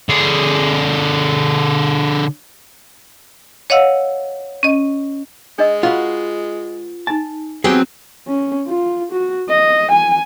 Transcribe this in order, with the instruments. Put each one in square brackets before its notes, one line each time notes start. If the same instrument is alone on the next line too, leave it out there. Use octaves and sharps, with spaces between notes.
[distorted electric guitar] D3 G#4
[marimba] C#5 D#5 F5 F#5 E6
C#4 D#5
[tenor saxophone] G#3 [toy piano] D4 D#5 E6
[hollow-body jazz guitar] F4 F#4 B4
[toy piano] D#4 G#5 [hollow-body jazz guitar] A5
[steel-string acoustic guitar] F#3 B3 C4 [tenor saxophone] G4 [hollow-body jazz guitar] G#4
[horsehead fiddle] C#4
F4
F#4
D#5
G#5